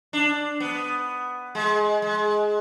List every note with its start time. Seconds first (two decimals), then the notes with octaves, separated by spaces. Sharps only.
0.13 D4
0.60 B3
1.55 G#3
2.02 G#3